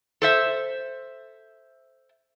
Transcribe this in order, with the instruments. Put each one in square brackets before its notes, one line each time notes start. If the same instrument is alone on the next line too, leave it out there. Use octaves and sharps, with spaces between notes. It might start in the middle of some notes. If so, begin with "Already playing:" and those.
[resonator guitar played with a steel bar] A4 C5 E5